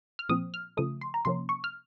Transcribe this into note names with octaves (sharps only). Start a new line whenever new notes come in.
F6
A#2 F3 C4 D#6
F6
C#3 F3 A3 D#6
C6
A#5
C3 F3 A#3 C#4 C6
C#6
F6